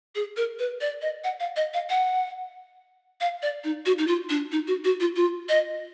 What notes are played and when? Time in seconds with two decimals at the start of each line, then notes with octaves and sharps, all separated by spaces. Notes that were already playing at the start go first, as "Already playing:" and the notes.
0.15 G#4
0.37 A#4
0.59 B4
0.81 D5
1.02 D#5
1.24 F#5
1.40 F5
1.56 D#5
1.74 F5
1.90 F#5
3.21 F5
3.42 D5
3.64 D#4
3.86 F#4
3.98 D#4
4.07 F4
4.30 D4
4.52 D#4
4.67 F#4
4.84 F#4
5.00 F4
5.16 F4
5.49 D#5